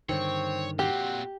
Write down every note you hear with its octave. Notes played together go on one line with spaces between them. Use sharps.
G2 D3 D#3 C4 C#5
A#2 C4 F#4 G4